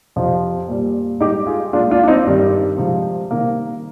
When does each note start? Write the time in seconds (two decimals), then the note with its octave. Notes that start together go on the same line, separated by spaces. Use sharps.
0.16 F2 C3 F3
0.69 A#2 G3
1.20 G#2 G3 D#4 G4
1.47 F4 G#4
1.73 A#2 G#3 D4 F4
1.91 D4 F4
2.03 D4
2.08 C4 D#4
2.26 G2 D#3 G3
2.78 C3 F3 G#3
3.31 C3 D#3 G3 A#3